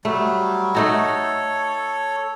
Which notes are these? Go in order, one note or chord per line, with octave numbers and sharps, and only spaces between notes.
F#3 G3 A3
A3 D#4 F#4 A4 C#5